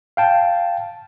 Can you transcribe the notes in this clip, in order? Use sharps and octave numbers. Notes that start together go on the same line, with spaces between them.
F5 G5 A5